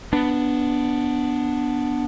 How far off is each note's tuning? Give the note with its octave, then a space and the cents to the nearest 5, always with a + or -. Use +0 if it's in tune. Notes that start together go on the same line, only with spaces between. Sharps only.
B3 +0 D4 +0